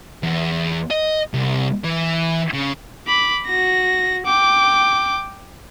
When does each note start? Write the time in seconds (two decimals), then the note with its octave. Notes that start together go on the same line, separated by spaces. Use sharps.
0.23 E2
0.91 D#5
1.34 C2
1.84 E3
2.53 C#3
3.07 B5 D6
3.46 F#4 A#6
4.26 G5 D6